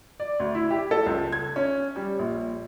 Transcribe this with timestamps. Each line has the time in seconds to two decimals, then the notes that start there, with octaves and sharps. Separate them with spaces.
0.20 D5
0.40 D2
0.55 E4
0.71 G4
0.91 A4
1.06 C#2
1.32 G#6
1.56 C#4
1.96 G3
2.19 A#1